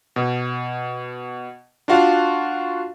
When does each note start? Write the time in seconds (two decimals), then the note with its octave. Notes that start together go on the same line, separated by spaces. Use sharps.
0.16 B2
1.88 D4 F4 F#4 F5